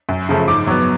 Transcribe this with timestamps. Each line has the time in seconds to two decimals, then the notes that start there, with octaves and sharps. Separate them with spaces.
0.09 F#2
0.29 C#3 F3 A3
0.48 G#2 D6
0.67 F#3 B3